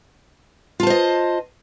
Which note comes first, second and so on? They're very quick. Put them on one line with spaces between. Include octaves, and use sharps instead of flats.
F4 A5 C5 D#5